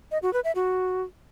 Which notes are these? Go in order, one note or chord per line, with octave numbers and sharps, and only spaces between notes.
D#5
F#4
B4
E5
F#4